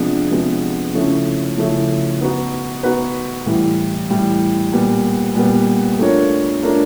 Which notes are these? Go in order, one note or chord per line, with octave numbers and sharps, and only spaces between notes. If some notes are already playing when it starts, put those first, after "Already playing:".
Already playing: C3 F3 G#3 B3 D4
C3 F3 G#3 B3 D4
C#3 F3 A3 C#4 E4
C#3 F3 A3 C#4 E4
B3 D#4 F#4 B4
B3 D#4 F#4 B4
A2 E3 G3
A2 E3 G3
A#2 G3 B3
A#2 G3 B3
A3 D4 F4 A#4 C#5
A3 D4 F4 A#4 C#5